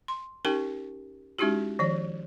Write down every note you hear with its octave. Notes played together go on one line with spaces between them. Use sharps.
C6
C#4 D#4 G4 A#4 G5 C#6
G#3 C#4 D#4 E4 F#4 G4
D#3 F3 C#5